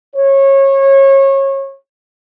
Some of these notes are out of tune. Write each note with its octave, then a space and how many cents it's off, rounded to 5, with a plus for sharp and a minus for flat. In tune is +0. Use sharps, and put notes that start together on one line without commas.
C#5 -25